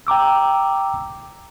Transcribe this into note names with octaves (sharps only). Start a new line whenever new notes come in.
G5 A#5 D6 E6